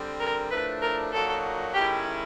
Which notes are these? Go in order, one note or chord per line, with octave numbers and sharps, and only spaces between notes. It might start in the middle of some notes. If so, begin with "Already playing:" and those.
Already playing: D3 G3 C4
A#4
A2 F3 A3 D4 B4
A#4
A#2 F#3 A#3 D#4 F#4 A4
D#3 G#3 C#4 E4 G4